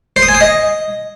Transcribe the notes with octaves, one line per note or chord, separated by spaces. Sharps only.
C5
D#6
G#5
D#6
D#5